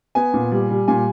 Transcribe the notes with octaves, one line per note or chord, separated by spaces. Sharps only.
B3 G#5
A#2
G3
G3
A#2 G#5